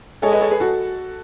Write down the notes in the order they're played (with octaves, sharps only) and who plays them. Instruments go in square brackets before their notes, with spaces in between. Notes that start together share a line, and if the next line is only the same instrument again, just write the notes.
[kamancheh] G#3 [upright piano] A4 C#5
[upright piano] B4 D#5
A4 C#5
G#4 B4
F#4 A4